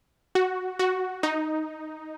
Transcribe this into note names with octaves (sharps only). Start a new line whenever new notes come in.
F#4
F#4
D#4